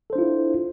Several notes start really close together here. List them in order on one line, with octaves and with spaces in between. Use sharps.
A4 C5 D4 F4 E4